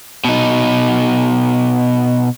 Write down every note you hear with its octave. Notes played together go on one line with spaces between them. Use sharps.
B2 D#4